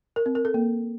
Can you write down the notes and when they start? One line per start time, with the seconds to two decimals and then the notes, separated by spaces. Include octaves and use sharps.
0.16 A#4
0.26 C4
0.35 A#4
0.45 A4
0.54 A#3